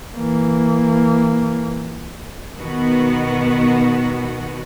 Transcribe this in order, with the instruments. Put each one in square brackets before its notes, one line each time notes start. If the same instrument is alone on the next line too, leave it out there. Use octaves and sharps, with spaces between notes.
[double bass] E3 A#3
[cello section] B2 D#3 B3 F#4